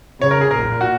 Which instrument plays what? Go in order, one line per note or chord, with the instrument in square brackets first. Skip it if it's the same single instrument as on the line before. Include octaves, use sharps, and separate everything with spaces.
[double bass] C#3 [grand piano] C#5
[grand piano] A#4
G#4
[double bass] A#2 [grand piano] A#4
[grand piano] F#4